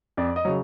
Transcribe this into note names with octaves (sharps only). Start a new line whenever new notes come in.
F2 D5
D#5
C#3 F#3